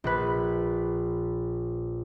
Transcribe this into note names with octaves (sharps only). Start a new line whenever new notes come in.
A#1 B4